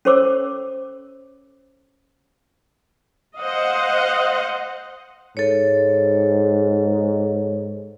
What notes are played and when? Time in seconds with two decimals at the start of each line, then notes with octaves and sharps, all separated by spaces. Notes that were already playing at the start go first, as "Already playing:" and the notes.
0.05 C#4 A4 C5 C#5 D6 E6
3.39 C5 D#5 F5 F#5
5.37 G#2 A4 C#5